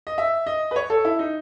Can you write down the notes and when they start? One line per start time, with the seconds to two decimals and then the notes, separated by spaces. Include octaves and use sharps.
0.07 D#5
0.18 E5
0.47 D#5
0.71 B4
0.76 C#5
0.90 A4
1.05 E4
1.19 D#4